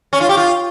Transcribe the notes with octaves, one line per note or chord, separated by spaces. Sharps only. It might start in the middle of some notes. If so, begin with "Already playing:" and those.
C#4
F4
G4
F4